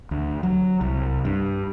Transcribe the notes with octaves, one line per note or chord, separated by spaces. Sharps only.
D2
F#3
C2
G2